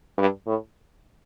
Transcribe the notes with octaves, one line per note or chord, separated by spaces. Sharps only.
G2
A2